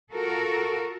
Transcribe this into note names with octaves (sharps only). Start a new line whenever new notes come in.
F4 F#4 A4 A#4